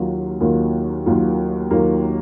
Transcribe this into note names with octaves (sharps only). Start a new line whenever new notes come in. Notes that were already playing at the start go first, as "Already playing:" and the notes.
Already playing: D#2 D#3 F#3 A#3 F4
D#2 D#3 F#3 A#3 F4
D#2 D#3 F#3 A#3 F4
D#2 D#3 F#3 A#3 F4